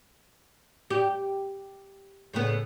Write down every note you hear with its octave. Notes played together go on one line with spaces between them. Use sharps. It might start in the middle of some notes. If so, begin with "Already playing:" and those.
G4
A2 C#3 B3